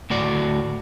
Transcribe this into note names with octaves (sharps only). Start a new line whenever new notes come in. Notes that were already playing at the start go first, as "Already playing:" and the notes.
D2 A2 F#4 D5